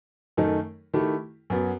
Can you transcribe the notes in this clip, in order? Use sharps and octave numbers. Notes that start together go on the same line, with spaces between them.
F#2 D#3 A3 D#4
D#3 A3 E4 G4
F#2 F#3 B3